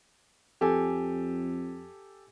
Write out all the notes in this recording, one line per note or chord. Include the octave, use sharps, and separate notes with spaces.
F2 G4 A4 G#5